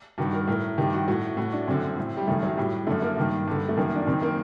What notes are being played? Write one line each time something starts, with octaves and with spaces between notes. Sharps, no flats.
G2 D#3 F#4
A#4
A2 A#4
G2 D#3 G4
F#4
A2 F#4
A2 F#4
D4
F#2 D3 C4
A2
G3
F#2 D#3 A3
F#3
A2 G3
F#2 D3 A3
A#3
G2 D#3
G2 D3
A3
F#2 D#3 A#3
D4
F#2 D#3 C4
A#3